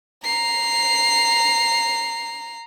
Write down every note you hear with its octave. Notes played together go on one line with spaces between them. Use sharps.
A#5 C7